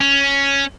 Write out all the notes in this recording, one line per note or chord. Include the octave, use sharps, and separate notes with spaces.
C#4